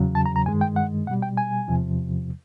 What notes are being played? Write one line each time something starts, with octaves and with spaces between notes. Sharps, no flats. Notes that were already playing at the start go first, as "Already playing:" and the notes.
Already playing: E2 C#3 F#3
A5
A#5
A#5
G2 D#3 G#3 G#5
G5
F#5
B2 G3 F#5
G5
G#5
E2 C3 F3